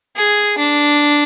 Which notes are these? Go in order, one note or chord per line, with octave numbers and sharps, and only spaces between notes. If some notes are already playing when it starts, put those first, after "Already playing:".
G#4
D4